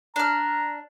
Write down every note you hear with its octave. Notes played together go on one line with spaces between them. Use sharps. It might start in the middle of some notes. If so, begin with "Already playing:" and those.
D4 A#5 F6